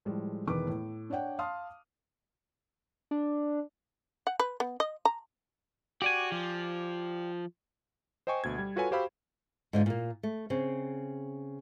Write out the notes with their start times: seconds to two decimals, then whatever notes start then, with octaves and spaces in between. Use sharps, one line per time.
0.05 A2 F3 G3 G#3
0.47 E1 D#3 E3 B4 D6
0.67 A2
1.10 D4 C#5 D5 F#5 G5
1.39 F5 A5 C6 D#6 F6
3.11 D4
4.27 F#5
4.40 B4
4.60 B3
4.80 D#5
5.05 A#5
6.02 F#4 G4 D5 G#5
6.32 F3
8.27 C5 D#5 G5 G#5 C#6
8.44 D2 B2 G#6
8.58 G3
8.76 F4 F#4 A4 B4 C#5 G#5
8.91 F#4 G4 C5 F5 B5 E6
9.73 G#2 D3 F4
9.86 A#2 A#3
10.23 A3
10.50 C#3 C4